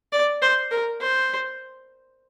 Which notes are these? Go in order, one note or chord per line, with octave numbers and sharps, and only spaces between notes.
D5
C5
A#4
C5